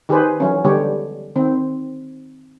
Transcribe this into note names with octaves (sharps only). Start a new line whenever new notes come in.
D#3 G4 G#4 B4 C5
E3 F#3 C#4
D3 G3 G#3 B3 G4 C#5
D#3 C4